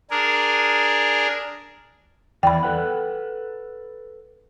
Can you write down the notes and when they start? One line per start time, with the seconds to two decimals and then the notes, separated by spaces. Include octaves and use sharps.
0.11 D4 G#4 A#4
2.43 E2 E3 D5 G5 B5
2.63 A4 B4 F#5